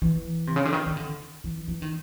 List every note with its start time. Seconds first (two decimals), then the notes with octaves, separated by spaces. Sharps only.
0.02 E3
0.47 C3
0.56 C#3
0.65 D3
0.73 D#3
0.86 D#3
0.97 D3
1.44 E3
1.68 E3
1.82 D#3